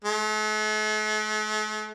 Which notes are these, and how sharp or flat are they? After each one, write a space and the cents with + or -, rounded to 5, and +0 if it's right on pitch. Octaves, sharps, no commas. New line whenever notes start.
A3 -45